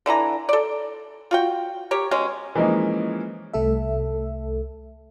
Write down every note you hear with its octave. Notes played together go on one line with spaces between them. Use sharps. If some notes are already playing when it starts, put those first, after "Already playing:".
D3 E3 E4 A#5
A4 D5
F4 F#4 G5
G4 A#4 C#5
B2 G#3 C#4
E3 F3 G#3 A#3 C#4 D#4
C2 A3 A4 E5